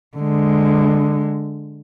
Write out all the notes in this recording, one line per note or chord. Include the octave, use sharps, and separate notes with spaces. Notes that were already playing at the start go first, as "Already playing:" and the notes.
D3 G#3